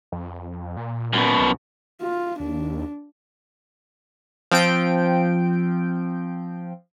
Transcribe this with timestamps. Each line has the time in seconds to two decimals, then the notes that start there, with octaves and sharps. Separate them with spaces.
0.12 F2
0.77 A#2
1.13 F#2 B2
1.39 C2
2.02 F4
2.40 D#2 D4
4.51 F3 C4 G5 D7